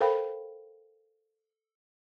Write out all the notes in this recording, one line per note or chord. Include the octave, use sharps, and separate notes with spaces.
A4 A#4 C5 F5 G5 B5